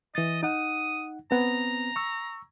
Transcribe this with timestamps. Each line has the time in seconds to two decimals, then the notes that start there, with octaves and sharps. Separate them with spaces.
0.15 E3 D#5 A6
0.43 D#4 F#5 D#6
1.31 B3 C4 A#5
1.96 C#6 E6